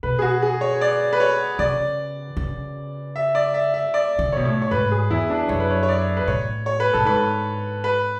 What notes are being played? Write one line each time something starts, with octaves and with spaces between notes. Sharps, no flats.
B2 B4
G#4
F#4
G#4
C#5
D5
B4
C#5
C#3 D5
C#3
E5
D5
E5
E5
D5
D3
B2 C#5
A2
C#5
G#2 B4
G#4
E2 E4
D4
F#2 C#5
B4
C#5
C#5
D5
B4
A2 C#5
C#5
B4
A2 A4
G#2 B4
B4